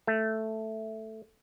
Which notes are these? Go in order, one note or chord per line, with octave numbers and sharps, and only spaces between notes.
A3